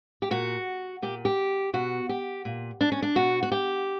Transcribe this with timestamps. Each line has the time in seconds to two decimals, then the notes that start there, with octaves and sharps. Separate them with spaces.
0.22 G4
0.31 A#2 F#4
1.02 A#2 G4
1.25 G4
1.74 B2 F#4
2.09 G4
2.45 A#2
2.81 D4
2.92 C#4
3.02 D4
3.15 B2 F#4
3.43 F#4
3.52 G4